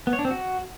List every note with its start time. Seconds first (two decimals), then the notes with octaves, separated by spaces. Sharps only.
0.07 B3
0.13 C#5
0.19 D4
0.25 C4
0.31 F#4